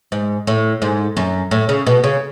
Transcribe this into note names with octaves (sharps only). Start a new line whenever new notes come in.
G#2
A2
G#2
F#2
A2
C#3
B2
C#3